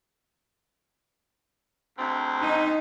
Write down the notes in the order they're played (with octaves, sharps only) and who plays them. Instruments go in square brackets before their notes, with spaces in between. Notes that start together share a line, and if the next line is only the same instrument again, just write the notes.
[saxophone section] D2 G#2 C4
[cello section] D#4